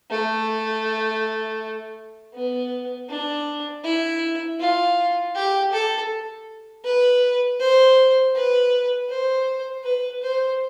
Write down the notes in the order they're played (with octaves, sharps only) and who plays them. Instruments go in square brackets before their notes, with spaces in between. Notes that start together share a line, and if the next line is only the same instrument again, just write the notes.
[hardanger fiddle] A3
B3
D4
E4
F4
G4
A4
B4
C5
B4
C5
B4
C5